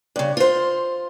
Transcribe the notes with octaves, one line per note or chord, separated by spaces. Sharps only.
G2 C#3
F4 C5